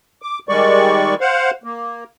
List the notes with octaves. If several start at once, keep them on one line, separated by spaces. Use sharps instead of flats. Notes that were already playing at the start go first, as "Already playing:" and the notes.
D6
D#3 G3 G#3 D5 C#6
C5 F5 F#5
A#3